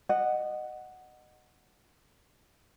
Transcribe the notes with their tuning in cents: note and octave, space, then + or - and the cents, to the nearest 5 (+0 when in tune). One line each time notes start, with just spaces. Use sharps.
D#5 -20 F#5 +0